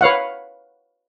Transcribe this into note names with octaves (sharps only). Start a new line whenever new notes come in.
B4 C#5 F5 F#5